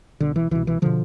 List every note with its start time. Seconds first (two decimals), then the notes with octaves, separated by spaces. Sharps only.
0.20 C2 B2 D3
0.36 E3
0.51 C2 B2 E3
0.67 E3
0.82 B2 D3 F3